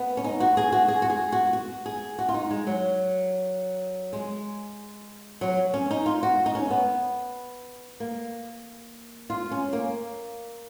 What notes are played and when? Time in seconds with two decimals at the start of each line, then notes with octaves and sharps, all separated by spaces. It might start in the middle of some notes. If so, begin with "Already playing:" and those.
Already playing: B3
0.17 C#4
0.24 D#4
0.40 F#4
0.57 G#4
0.72 F#4
0.88 G#4
1.02 F#4
1.10 G#4
1.32 F#4
1.53 F#4
1.86 G#4
2.19 F#4
2.29 F4
2.34 D#4
2.51 G#3
2.67 F#3
4.13 G#3
5.41 F#3
5.74 C#4
5.91 D#4
6.06 F4
6.23 F#4
6.46 D#4
6.55 C#4
6.70 B3
8.00 A#3
9.30 F4
9.51 C#4
9.73 A#3